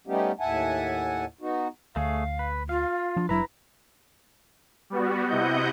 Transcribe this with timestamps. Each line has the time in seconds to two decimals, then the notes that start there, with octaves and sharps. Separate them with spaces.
0.07 G3 A3 B3 C#4 D#4 G4
0.40 D#2 A2 E5 F#5 G#5 A5
1.41 B3 D#4 F#4
1.96 D2 A3 G#4 C#5 F5
2.39 B4
2.69 F4 F5
3.16 F3 D4
3.29 F#1 F#3 D4 E4 B4 A#5
4.90 G3 B3 F#4
5.28 C3 E4 D#5 F#5 G6